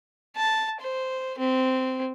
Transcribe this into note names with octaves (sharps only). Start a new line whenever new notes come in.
A5
C5
C4